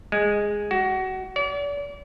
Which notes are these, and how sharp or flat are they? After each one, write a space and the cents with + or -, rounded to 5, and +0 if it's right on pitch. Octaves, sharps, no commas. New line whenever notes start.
G#3 -5
F#4 +25
D5 -40